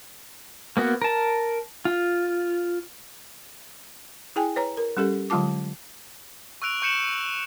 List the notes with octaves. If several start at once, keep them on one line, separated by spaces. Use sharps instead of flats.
A#3 B3 F#4
A#4 A5
F4
E4 G#4 G5 G#5
B4 C#5 A#5
A#4
G3 C#4 G4 A4
D3 F#3 G#3 F4 A5 D6
C#6 E6 F#6 D7 F7
C#6 G6 C#7 E7 F#7